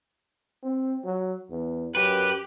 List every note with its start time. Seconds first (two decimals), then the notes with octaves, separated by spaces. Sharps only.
0.63 C4
1.04 F#3
1.50 E2
1.95 F#2 G4 B4